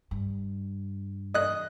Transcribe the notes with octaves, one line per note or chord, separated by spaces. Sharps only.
G2
D#5 F#6